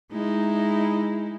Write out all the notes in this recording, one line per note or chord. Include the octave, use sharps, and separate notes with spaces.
G#3 D#4 E4